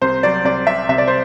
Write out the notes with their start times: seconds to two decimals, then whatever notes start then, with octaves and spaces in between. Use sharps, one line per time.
0.01 C2 C5
0.23 F#3 D5
0.44 C2 D5
0.67 C3 E5
0.89 C2 E5
0.98 D5
1.07 C5